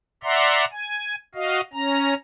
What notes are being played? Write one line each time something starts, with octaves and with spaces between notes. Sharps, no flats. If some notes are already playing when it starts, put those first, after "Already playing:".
D5 E5 F#5 A#5 C6
G#5
F#4 D#5 F5
C#4 A#5